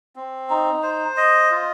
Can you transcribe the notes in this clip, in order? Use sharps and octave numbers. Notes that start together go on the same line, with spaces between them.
C4
D#4
C5
D#5
F4